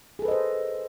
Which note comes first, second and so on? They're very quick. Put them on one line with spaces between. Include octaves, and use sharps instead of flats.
G#4 A4 B4 D#5 C5